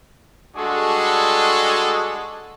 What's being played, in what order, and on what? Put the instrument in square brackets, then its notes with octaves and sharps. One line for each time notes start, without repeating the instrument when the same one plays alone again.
[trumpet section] G3 G#3 D4 F#4 G#4 A4